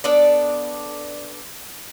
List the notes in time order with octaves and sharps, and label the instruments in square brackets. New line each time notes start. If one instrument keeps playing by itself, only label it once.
[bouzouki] B3 D4 A4 D5